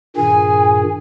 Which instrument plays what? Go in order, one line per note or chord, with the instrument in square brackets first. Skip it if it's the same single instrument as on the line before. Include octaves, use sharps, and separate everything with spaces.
[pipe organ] G2 A#2 D#3 [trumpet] G#4 [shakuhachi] G#5